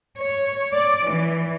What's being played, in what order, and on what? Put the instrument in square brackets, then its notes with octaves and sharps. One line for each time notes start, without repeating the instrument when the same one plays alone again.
[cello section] C#5
D5
E3